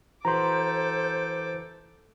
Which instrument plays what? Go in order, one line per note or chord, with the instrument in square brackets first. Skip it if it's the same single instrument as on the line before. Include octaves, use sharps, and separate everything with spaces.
[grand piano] E3 F#4 B4 [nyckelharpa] A4 D6 [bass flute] C5 [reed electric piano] A#5 C6